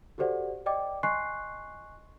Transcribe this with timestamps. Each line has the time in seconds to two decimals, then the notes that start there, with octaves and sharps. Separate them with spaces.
0.18 F#4 G4 A4 C5 D5 F#5
0.66 D5 D#5 G5 D6
1.03 D#5 G#5 C6 C#6 F#6 C7